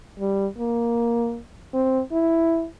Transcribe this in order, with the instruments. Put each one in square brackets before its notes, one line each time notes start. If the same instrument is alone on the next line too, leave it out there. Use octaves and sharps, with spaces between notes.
[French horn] G3
A#3
C4
E4